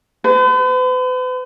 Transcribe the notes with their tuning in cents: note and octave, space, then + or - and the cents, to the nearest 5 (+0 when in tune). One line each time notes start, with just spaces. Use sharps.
B4 +45